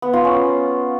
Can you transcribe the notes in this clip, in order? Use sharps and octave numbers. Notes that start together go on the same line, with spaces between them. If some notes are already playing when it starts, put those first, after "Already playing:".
B3
F4
C#4